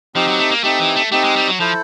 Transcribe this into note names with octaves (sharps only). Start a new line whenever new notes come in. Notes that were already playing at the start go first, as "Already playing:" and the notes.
F3 C4 D#4 G4
F#3
A3
A#3
A3 C4 D#4 G4
E3
A3
A3 C4 D#4 G4
G#3
G3
F#3
F3 E4 A4 C5